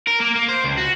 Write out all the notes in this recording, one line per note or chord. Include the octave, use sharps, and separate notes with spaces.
A#4
A#3
A#3
C5
C#2
F#4